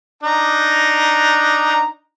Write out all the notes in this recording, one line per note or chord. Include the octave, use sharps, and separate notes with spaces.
D4 D#4 A#5